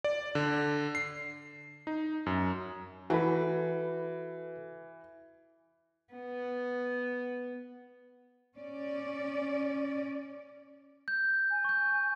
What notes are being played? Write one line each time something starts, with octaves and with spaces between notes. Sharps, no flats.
D5
D3
C7
D#4
F#2
E3 F#4 A4 B4
B3
C#4 D5
G6
G#5
C#6 G6